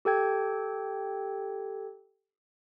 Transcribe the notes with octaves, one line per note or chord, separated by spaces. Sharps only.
G4 A4 G5 G#6